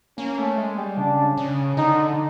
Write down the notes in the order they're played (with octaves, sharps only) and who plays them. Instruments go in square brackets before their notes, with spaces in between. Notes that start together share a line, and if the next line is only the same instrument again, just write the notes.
[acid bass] A#3 [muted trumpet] C#4
[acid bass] A3
G#3
G3
[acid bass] C#3 [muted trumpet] D4
[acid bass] C#3
[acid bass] D3 [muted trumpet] D#4